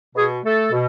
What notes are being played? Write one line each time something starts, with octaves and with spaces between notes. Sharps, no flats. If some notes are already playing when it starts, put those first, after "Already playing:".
B2 G#4
A3 A4
B2